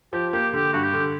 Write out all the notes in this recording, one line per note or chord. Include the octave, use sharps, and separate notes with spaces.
F3 G4
A#3 G4
D3 G4
G2 F#4
G4
D3